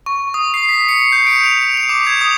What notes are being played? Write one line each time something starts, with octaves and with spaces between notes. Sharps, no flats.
C#6
D#6
C7
B6
C#7
G6
D7
F7
F7
D6
G#6
D#6